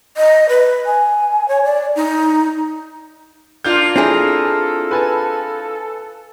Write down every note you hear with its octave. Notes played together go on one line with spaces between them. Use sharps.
D#5
B4
G#5
C#5
D5
D#4
A#3 D4 F4 G6
C4 E4 G#4 A4
B4 G#5 A5